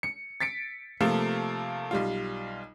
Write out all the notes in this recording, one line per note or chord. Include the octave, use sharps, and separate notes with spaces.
C#7
A6 B6 C#7 D7
C3 F3 A3 A#3
B1 G3 F4